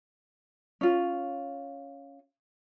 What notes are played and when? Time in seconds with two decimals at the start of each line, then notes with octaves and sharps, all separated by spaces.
0.81 C#4 F4